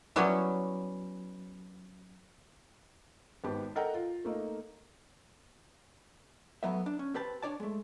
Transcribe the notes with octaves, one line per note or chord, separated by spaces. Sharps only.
F#3 G3 B3 C#4 E4
G#1 B3 G4 A5
A4 A#4 D#5 F#5 G5 A#5
F4
A3 A#3 D#4
A2 F#3 B3 E5
D4
C#4
C4 G4 B4 A5
D4 C#5 D5 A5
G#3 A3